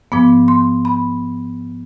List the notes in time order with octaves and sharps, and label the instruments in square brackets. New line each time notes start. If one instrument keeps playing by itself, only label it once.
[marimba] G#2 F3 B3 D6
C6
B5